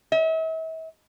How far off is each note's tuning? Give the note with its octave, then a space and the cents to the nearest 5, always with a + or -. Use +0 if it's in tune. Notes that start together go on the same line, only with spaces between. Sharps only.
E5 -40